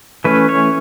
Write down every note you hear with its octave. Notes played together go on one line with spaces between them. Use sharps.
E3 A3 C#4 B4
C#5